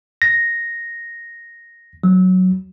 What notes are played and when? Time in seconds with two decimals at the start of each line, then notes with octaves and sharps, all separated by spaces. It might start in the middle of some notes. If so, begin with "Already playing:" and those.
0.22 A#6
2.04 F#3